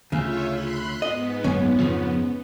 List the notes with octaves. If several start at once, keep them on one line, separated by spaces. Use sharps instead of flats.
D2 C#3 F4 C#5 E5
B5 C6 F#6
G#2 B3 D#5
F#1 C#2 C#4
F2 C#3 F3